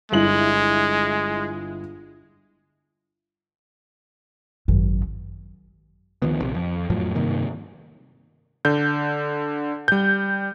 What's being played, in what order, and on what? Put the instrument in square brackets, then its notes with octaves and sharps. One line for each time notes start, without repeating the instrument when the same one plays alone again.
[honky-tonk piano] G1 E4 F#7 [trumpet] G#3
[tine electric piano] G#1 [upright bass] F#2
[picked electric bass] D2 D#3 F3 B3
A#1 C3
F2
F2 A2 F3 F#3
G2 C3 D#3 A#3
[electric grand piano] D3 G6
G3 G6